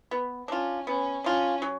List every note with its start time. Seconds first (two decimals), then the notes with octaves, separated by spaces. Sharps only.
0.11 B3
0.48 C#4 D4 F4
0.87 B3 C#4
1.24 C#4 D4 F4
1.62 F#3